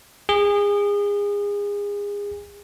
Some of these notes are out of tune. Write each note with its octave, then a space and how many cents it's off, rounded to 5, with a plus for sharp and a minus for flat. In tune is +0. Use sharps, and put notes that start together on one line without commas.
G#4 -30